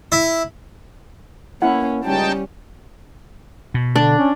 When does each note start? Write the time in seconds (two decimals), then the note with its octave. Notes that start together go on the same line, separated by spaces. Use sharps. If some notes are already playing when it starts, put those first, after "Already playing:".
0.12 E4
1.62 A#3 C#4 E4 F#5
2.04 C#2 G3 C#4 D#4 G5 A5
3.74 B2
3.96 D3 D4
4.18 C#4